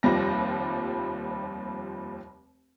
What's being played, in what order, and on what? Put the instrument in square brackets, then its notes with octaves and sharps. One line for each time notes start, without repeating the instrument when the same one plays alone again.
[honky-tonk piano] F1 D#2 F3 G3 A#6